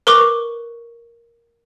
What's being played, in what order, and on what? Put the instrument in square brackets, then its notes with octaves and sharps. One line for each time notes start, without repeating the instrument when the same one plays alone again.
[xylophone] A#4 B4 C#6 D6